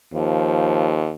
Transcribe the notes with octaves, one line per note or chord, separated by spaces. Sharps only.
D#2 F3